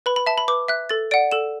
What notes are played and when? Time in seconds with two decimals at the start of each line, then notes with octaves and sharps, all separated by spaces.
0.06 B4 B5
0.16 B5
0.26 E5 A5
0.38 B5
0.48 B4 D6
0.68 E5 F#6
0.89 A4 A6
1.11 D5 F#5 D7
1.32 A4 E7